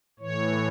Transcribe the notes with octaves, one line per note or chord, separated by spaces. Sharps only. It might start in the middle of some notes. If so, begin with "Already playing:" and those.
A2 E3 C#5